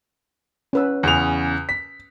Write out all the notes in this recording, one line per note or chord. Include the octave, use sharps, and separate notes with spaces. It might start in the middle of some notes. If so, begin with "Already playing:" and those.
C#4 B4 E6
E2 C#3 F7
B6